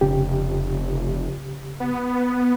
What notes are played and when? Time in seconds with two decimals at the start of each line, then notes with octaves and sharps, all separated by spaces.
0.01 F1 C#3 G4
1.80 B3